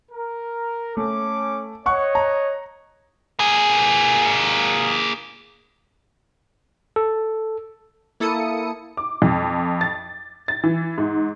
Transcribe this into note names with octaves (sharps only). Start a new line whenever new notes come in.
A#4
A3 C#4 D6
C#5 D#5 F#5 C#6 F#6
A#5
A#3 G#4
A4
A#3 E4 A4 D#6 C#7
D6
F2
A6
A6
E3
G#2